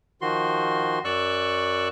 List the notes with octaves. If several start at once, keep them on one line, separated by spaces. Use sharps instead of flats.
D#3 F3 F#4 C6
F#2 D5 C#6 E6 F#6